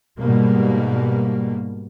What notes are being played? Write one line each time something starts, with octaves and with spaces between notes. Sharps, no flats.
G#2 B2 G3 A#3